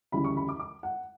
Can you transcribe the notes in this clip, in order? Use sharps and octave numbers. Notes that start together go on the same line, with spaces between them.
D2 C#3 E3 G3 B5
C#6
B5
D6
D6
F#5